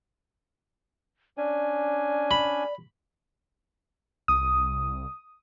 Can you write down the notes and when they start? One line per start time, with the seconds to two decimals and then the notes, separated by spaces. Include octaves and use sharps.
1.37 C#4 D4 D5 G#5
2.31 B5
4.28 C2 D#6